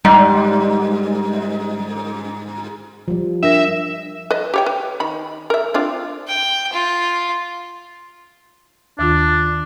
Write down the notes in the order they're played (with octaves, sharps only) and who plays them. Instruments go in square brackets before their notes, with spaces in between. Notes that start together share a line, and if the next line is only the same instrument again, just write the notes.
[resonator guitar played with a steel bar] G#2 [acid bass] G3
[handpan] F3 G3
[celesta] D4 A#4 A#6 [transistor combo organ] E5
[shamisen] B4 D#5
G4 C#5 G5
B4
D#3 B5
A#4 E5
C4 D4 F4
[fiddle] G5
F4
[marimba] D#2 D#3 F4 [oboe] D4